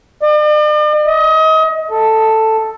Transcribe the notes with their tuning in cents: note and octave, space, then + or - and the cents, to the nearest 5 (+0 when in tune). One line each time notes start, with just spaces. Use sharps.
D5 +45
D#5 +30
A4 +5